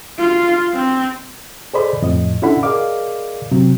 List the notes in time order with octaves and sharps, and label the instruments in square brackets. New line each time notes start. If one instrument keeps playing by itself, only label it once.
[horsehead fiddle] F4
C4
[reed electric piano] G#4 A4 C5 D5 D#5 B5
F2 A2 D#5
C#4 D4 E4 A4 F#5 B5
G#4 A#4 D5 D#5 F5 D6
C3 F#3 C4